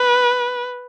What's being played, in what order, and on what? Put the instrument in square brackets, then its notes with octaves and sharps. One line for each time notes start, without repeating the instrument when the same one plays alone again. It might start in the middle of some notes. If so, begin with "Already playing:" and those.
Already playing: [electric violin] B4